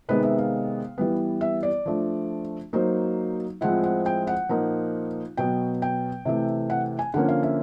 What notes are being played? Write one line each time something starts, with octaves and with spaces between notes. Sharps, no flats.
C3 D#3 G#3 B3 B4
E5
F5
E3 G3 B3
E5
D5
F3 A3 D4
F#3 A#3 D#4 C5
A2 F3 G#3 C4 E4 F#5
F#5
G5
F#5
A#2 F3 A#3 D#4
B2 F#3 B3 G5
G5
C3 E3 A3
F#5
G#5
D3 F3 A#3 C#4 F#5
F5
E5